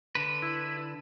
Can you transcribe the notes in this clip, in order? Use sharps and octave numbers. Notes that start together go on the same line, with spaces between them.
D3 B4
E4